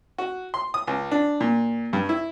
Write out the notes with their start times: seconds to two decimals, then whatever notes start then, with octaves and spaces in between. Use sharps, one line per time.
0.18 F#4
0.54 C6
0.74 D#6
0.87 C#2
1.11 D4
1.41 A#2
1.93 G2
2.09 E4